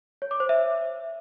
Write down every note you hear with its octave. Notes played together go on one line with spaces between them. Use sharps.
C#5
D6
C5
E5